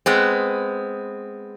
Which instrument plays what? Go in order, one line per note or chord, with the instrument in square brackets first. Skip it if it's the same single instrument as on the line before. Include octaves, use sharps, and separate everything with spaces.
[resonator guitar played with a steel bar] G#3 B3 C4